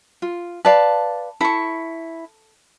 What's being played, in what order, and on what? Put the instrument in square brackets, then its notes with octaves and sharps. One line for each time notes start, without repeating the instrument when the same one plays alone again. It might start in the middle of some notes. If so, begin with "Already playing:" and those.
[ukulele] F4
[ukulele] B4 D5 F5 [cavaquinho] A5
[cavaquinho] E4 C#6 [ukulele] A4